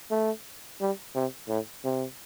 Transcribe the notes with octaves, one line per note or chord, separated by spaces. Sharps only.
A3
G3
C3
A2
C3